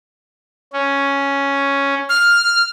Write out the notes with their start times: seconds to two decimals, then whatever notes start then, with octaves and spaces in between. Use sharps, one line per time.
0.73 C#4
2.09 F6